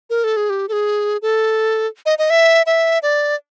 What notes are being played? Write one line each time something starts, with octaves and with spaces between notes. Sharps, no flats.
A#4
A4
G#4
G4
A4
G#4
A4
D#5
D#5
E5
E5
D5